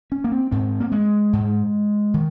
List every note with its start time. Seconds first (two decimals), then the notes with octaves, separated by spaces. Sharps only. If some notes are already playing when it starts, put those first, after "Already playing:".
0.12 C#4
0.24 A#3
0.32 C4
0.51 G#2 C4
0.80 A#3
0.92 G#3
1.33 G#2
2.14 D#3